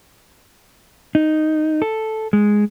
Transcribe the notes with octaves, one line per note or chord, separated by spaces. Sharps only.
D#4
A4
G#3